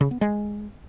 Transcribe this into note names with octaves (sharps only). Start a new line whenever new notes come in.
C#3
B3
G#3